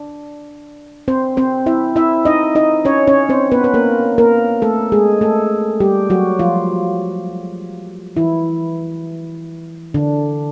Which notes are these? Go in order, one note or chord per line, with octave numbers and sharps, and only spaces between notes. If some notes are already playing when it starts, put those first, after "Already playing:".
Already playing: D4
C4 C5
C4 C5
E4 E5
E4 E5
D#4 D#5
D#4 D#5
C#4 C#5
C#4 C#5
C4 C5
B3 B4
B4
A#3 A#4
A#3 A#4
A3 A4
G#3 G#4
A3 A4
G3 G4
F#3 F#4
F3 F4
E3 E4
D3 D4